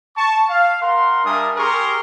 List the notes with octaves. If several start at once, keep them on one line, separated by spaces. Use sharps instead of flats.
A5 C#6
F5
A#4 F5 F#5 C6
G3 D4 A#4 E5 G#5 D#6
G4 G#4 A#4 C6 C#6